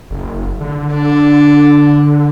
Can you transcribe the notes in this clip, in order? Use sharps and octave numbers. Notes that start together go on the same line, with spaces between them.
F#1
D3
D4